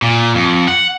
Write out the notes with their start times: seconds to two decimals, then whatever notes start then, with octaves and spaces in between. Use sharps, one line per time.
0.02 A#2
0.35 F2
0.68 F#5